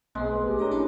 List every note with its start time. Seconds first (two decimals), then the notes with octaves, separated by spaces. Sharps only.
0.15 B1 G#3 A3 B3 C4
0.31 B4
0.46 A1 G4
0.59 D4 G#4 A#4 C#5 D5 A#5
0.71 C#4 E4 A4 B5 C6